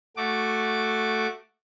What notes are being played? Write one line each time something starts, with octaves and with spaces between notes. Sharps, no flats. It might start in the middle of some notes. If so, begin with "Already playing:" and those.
A3 F#4 D6